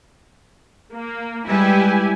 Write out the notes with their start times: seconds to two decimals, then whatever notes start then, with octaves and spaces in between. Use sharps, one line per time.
0.93 A#3
1.47 G3 G#3 E4 G4 B4 G#5